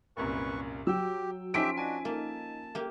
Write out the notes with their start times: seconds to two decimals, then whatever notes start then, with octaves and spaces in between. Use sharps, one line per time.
0.17 C2 F#2 A#2 B4 C#6
0.87 F#3 G4 G5 E6
1.54 F3 C#4 D#4 G4 E5 B6 D7
1.77 D4 F#4 G#5
2.05 A#3 A5
2.75 A#3 G4